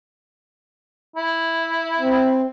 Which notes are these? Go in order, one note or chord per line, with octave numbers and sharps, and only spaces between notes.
E4
C4